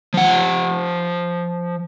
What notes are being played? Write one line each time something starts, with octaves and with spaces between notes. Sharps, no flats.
F3 F#5